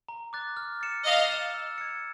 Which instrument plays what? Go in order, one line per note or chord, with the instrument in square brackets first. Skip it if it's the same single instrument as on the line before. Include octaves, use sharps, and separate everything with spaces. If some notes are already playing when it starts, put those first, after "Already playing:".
[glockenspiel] A#5
D6 F#6 A6
F6
A6 C#7 E7
[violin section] D#5 F5 [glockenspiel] F6
[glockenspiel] A6 C#7 E7
E6
G#6 C#7